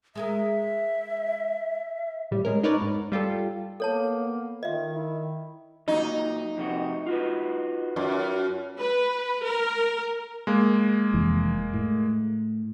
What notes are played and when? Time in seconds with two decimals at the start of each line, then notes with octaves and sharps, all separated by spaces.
0.15 G#3 G#4 A#4 E5
2.31 A2 G3
2.45 G#3 C#4 A#4
2.63 D#4 A#4 B4 C#5 D5
2.81 G#2
3.12 G3 F4 G4 A4
3.80 A#3 B3 A4 C#5 A5
4.63 D#3 F4 D#5 E5
4.95 E4
5.88 A#2 F#3 D#4
6.57 F2 C3 F#4
7.06 F4 F#4 B4
7.96 F#2
8.78 B4
9.44 A#4
10.47 G#3 A#3
11.14 F1 F2 E3
11.73 A2